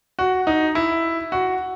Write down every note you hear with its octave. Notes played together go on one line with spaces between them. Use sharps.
F#4
D#4
E4
F#4